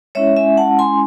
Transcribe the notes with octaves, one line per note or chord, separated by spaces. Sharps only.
G#3 C#4 E4 C#5 E5
E5 G#5
F#5 A5
G#5 C6